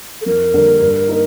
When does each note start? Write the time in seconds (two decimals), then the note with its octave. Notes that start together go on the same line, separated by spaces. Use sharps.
0.21 A4
0.26 F2 A#4
0.54 D3 G3 A#3
0.81 G2
1.09 A#3 D#4